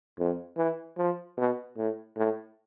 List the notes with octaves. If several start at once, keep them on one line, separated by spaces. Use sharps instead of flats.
F2
E3
F3
B2
A2
A2